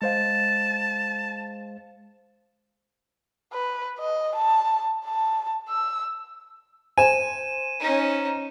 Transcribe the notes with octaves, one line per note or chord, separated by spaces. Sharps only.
G#3 C5 F5 A5
B4
D#5
A5
A5
E6
C5 G#5 D#7 E7
C#4 D#4